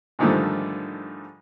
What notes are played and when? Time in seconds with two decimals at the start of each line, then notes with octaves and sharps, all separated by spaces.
0.19 G#2 D3 D#3 F3 G3 A3